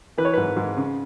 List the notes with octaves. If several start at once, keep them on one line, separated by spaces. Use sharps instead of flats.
E3 B4
C#5
G#2 B4
G#2
C#3